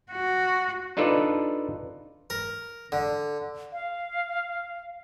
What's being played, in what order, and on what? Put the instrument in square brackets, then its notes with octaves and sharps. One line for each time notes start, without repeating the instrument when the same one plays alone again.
[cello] F#4
[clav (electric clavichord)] D4 D#4 F4 A4 B4 D5
[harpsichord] A#4
D3
[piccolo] F5